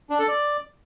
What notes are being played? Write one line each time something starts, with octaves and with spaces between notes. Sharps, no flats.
D4
A4
D5